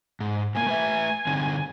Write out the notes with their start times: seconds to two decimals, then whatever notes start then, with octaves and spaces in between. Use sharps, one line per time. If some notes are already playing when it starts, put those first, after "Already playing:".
0.20 G#2
0.55 A2 A#3 G#5
0.66 A3 B4 E5
1.27 D3 C4 D#4